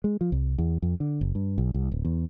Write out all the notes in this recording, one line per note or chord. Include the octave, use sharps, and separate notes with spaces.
G#3
F3
C2
E2
F2
D3
F#1
G2
B1
C2
D1
E2